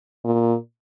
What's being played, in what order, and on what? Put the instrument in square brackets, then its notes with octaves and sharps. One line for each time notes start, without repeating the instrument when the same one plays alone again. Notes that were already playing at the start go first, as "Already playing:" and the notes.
[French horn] A#2